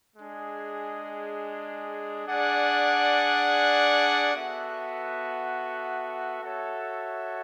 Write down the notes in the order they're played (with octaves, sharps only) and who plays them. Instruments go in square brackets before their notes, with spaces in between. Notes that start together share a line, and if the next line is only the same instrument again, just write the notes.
[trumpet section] G#3 D4 G#4
D4 G#4 D5 F#5
B3 F#4 A4 E5
F#4 A4 C#5 E5